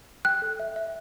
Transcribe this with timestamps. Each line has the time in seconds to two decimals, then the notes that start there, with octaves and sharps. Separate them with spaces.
0.25 G5 F#6
0.42 A4
0.60 E5
0.76 E5